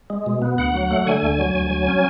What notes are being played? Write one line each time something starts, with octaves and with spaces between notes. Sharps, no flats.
G#3
B2
B3
D2 F#5
F#3
A3
D3 G#5
D2
F#3
D2
F#3
C#4